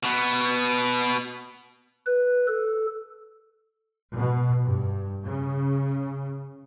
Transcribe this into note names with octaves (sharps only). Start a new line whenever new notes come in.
B2 B3
B4
A4
B2
G2
C#3